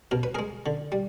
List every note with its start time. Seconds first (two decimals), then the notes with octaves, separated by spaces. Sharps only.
0.11 B2 A#4
0.23 B4
0.35 G#3 G#4 A#4
0.66 D3
0.92 G3